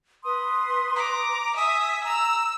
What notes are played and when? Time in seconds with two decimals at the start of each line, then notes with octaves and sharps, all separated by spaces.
0.23 B4 C6 D#6
0.96 A#5 D6
1.56 E5 G#5 D#6
2.04 A#5 E6